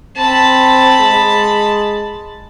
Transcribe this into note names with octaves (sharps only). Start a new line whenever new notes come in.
C4 A5 B5
G#3